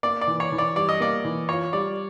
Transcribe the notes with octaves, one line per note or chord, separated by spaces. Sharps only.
A#3 D5
D5
E3
C#5
E3
D5
G3 D5
D#5
A#3 D5
E3
F4 C#5
G3 D5